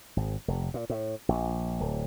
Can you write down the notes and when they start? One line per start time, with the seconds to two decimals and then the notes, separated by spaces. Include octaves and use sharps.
0.16 G#1
0.48 F1
0.74 A#2
0.90 A2
1.29 A#1
1.80 D1